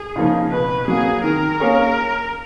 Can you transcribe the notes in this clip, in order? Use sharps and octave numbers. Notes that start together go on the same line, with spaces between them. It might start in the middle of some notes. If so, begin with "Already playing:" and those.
Already playing: G#4
C#3 F3 A#3 D#4
B2 B4
F#3 A#3 G#4
D#3 A#4
A#3 C#4 G#4 C#5